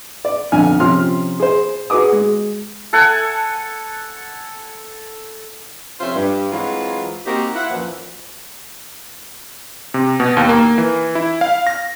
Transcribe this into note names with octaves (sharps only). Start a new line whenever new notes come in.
D5
B1 F2 D3 G#5 F6
C3 F3 C#4 C6 F6
G#4 C5
F#4 G#4 B4 D6 D#6
G#3
A4 F#5 G#5
F2 C3 C#4 F4 C5 E5
G2
E3 F#3 G#3 C4 F4
A#3 C4 D#4 F#4 G4 A#4
E4 F4 F#5
F#2 A#2 E3 F3
C3
B2
D#2
A#3
E3
E4
F5
A#6